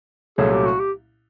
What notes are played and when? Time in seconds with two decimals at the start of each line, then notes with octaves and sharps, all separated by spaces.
0.38 C2 A#2 F#3 A3 C#4 G#4
0.52 G4
0.66 F#4
0.79 G4